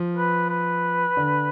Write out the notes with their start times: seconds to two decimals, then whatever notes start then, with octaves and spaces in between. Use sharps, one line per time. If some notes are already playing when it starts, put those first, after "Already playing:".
Already playing: F3
0.15 B4
0.49 B4
1.17 D3